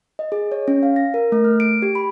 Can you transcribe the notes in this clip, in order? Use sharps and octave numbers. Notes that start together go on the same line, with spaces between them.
D#5
G#4
C#5
C#4
F5
A#6
A#4
A3
F6
D7
G4
B5